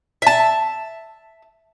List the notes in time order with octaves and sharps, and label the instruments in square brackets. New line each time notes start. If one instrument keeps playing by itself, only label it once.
[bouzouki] E5 A5